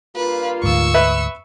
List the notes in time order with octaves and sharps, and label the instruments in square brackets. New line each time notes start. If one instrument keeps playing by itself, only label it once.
[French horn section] G2 A#3 F4 [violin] B4
[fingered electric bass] D2 G#2 [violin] C#6 E6
[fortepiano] B4 E5